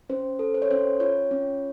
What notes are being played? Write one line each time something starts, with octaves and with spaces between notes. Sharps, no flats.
C#4 C5
A4
C5
C#5
C#4 C5
F4 C#5
C#4